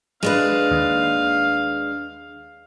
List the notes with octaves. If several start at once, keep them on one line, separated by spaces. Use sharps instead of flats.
G#3 D4 B4 F5
D#2